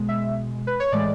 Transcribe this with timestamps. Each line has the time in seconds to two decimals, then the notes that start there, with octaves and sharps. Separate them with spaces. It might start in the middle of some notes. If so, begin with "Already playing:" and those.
Already playing: B2 G#3
0.09 E5
0.67 B4
0.80 C#5
0.92 A2 E3 G#3 D5